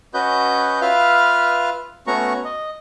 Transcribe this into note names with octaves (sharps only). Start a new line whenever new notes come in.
C#4 F#4 B4 D#5 G6
F4 B4 E5 F5 F6
A3 B3 C#4 F#4 A#5 C#6
D#5